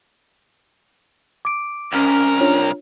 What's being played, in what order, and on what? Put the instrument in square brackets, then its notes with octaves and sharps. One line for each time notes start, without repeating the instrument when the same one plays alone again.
[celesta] D6 D7
[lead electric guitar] C2 A#4 [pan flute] C#4
[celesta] D4 F4 C#5